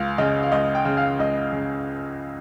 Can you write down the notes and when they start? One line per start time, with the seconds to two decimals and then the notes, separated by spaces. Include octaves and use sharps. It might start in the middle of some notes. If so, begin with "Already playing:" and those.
Already playing: C#2 F5
0.18 C#3 D#5
0.43 F5
0.52 C#2 D#5
0.75 G5
0.85 C#3
0.97 F5
1.19 C#2 D#5
1.53 C#3